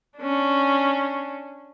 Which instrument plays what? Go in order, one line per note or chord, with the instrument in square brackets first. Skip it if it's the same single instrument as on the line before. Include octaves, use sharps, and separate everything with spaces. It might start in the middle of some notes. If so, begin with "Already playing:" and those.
[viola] C#4 D4